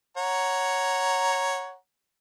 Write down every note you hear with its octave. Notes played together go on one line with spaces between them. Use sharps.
C#5 F#5 A#5